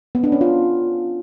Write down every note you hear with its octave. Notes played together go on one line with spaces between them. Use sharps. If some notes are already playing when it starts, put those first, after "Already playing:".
B3
D4
C#4
F4